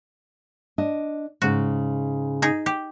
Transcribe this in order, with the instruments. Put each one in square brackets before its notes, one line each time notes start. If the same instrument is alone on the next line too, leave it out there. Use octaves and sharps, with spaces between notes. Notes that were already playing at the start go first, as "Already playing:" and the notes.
[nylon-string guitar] D4 D#5
[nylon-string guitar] G#2 C#3 [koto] F#4
[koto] D#4 G#4
G4